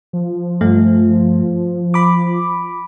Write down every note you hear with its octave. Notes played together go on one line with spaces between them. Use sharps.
F3
G2 A3
B5 D6